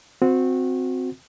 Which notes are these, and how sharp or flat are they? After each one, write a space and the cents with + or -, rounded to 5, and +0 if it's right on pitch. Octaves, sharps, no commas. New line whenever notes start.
C4 -10 F#4 -25